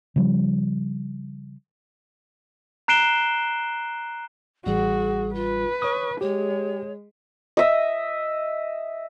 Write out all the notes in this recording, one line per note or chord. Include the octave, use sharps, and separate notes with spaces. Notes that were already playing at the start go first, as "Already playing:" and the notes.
C#3 F3 G3
A#5 F#6 C7 D7 E7 G7
A1 G3 F#4 G#4
F4 B4
C#5 C#6 D#6
G#3 G4 C#5
D#5 E5